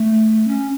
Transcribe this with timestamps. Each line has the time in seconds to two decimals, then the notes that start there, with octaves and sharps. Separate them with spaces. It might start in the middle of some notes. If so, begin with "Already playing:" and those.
Already playing: A3
0.48 C#4